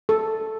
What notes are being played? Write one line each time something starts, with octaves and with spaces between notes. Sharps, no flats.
A4